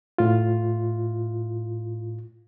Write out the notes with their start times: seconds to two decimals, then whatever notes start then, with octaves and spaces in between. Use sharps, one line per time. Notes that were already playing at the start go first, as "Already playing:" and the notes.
0.18 A2 F4